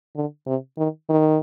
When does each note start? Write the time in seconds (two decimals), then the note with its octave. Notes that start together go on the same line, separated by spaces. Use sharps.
0.15 D3
0.47 C3
0.78 D#3
1.09 D#3